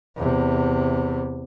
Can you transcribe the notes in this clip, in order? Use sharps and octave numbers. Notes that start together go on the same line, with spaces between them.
E2 C3